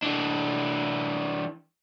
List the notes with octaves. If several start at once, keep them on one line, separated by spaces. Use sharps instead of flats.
E3 D4